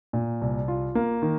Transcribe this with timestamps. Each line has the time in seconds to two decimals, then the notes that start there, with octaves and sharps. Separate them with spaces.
0.13 A#2
0.42 C2
0.68 F4
0.95 A#3
1.22 D#3